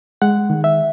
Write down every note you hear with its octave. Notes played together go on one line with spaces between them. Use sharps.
G#3 F#5
D#3
E5